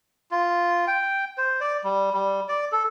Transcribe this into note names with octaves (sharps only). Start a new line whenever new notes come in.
F4
G5
C5
D5
G3
G3
D5
A4